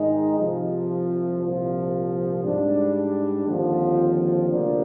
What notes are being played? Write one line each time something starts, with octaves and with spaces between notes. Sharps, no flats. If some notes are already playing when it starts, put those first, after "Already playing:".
Already playing: G#2 D#3 G#3 D#4
C2 C3 F3
C2 A#2 F3
G#2 G3 D4
D#2 D3 F3 C4
D2 C3 F3 A#3 D4